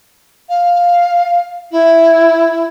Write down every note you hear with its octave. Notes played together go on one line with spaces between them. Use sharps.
F5
E4